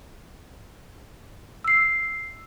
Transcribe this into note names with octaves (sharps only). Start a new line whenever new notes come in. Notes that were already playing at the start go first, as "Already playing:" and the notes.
E6 C7